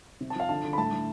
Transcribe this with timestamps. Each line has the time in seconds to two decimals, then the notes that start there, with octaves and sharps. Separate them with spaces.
0.21 C3
0.30 A5
0.35 F3 F5
0.49 D3 A5
0.64 D3
0.73 B5
0.78 A2 A5
0.92 A2